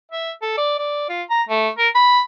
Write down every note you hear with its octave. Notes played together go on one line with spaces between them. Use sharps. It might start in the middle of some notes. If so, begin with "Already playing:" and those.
E5
A4
D5
D5
F4
A#5
A3
A#4
B5